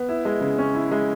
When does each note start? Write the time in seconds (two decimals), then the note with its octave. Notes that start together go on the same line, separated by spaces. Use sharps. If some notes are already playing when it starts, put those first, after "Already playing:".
Already playing: B3
0.09 E4
0.25 G#3
0.41 C#3
0.58 C#4
0.75 E4
0.91 G#3